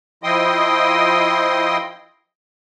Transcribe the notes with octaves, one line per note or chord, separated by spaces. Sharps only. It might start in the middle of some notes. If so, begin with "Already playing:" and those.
F3 E4 D#5 G5 C6 D#6